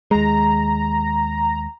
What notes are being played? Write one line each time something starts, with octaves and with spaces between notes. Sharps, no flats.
D#2 G#3 A#5